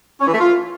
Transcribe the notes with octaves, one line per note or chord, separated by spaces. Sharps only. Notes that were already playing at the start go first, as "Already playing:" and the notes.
C#4
E3
A3
F4